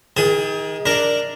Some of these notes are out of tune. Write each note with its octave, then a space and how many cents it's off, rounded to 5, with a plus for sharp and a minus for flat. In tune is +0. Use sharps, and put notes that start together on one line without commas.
D#3 +30 G#4 -20 D#6 +25
D4 +0 A#4 +0